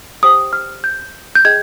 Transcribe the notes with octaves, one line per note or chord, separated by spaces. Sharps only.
G4 C5 G5 D#6
F6
G6
G6
G#4 D#5 G5 G#6